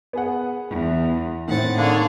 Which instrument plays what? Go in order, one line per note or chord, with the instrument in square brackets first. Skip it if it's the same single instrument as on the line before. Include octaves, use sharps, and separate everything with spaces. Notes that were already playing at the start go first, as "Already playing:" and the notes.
[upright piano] B3 G#4 F#5
[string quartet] E2
[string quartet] A2 F#5 A6 [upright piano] D#3 C4
[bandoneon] D3 A#3 D4 [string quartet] G#4 C#5